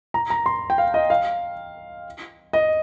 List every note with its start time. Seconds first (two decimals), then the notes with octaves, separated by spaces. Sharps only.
0.14 A#5
0.30 A#5
0.46 C6
0.70 G5
0.78 F5
0.94 D#5
1.10 F5
2.53 D#5